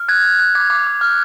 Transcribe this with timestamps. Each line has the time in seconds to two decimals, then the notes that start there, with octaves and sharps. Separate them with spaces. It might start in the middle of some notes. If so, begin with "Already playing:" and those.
Already playing: F6
0.08 F#6 G#6
0.24 F#6
0.39 F#6
0.55 D6 G#6
0.70 D6
0.87 D6
1.01 F6